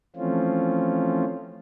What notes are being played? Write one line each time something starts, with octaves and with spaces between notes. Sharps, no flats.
E3 F3 A3 C4 C#4 F4